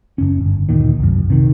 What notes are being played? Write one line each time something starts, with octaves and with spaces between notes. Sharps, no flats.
F#1 C#4
D1 G1
D2 A#2 D#3
C2 F#2
C3 D#3